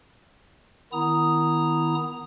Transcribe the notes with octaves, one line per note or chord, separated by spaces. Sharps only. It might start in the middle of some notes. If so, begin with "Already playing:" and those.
D#3 B3 E4 A#5 D#6